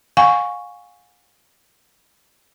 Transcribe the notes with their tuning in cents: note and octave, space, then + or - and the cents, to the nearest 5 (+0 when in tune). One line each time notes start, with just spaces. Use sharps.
F5 +35 G#5 -20 C#6 +0